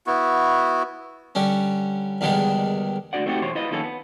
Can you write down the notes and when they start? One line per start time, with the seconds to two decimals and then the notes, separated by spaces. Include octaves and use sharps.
0.07 B3 E4 F#4
1.35 D3 G3 C#4
2.21 E2 D3 D#3 G3 G#3
3.13 D2 C#3 D4 F#4 D5 F#5
3.26 A3 C4 D#4 E4 F#4 G4
3.42 E2 B2 C5 C#5
3.55 E4 F4 B4 D#5
3.71 D#3 F3 A#3 B3 C#4 A4
3.84 B3